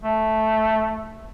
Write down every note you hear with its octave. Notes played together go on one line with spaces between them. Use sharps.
A3